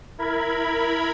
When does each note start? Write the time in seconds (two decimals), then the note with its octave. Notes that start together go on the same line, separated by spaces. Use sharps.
0.18 E4 A#4 B5 G#6